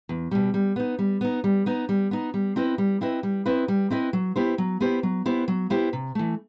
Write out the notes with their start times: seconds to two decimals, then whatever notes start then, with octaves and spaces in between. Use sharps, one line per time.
0.09 E2
0.31 B2 G3
0.54 G3
0.76 B3 D#4
0.99 G3
1.21 B3 D#4
1.44 G3
1.66 B3 D#4
1.89 G3
2.11 B3 D#4
2.34 G3
2.56 C4 E4 B4 D#5
2.78 G3
3.01 C4 E4 B4 D#5
3.23 G3
3.46 C4 E4 B4 D#5
3.68 G3
3.90 C4 E4 B4 D#5
4.13 F#3
4.36 B3 E4 G4 C5
4.58 F#3
4.81 B3 E4 G4 C5
5.03 F#3
5.26 B3 E4 G4 C5
5.48 F#3
5.70 B3 E4 G4 C5
5.93 C3
6.15 E3 A3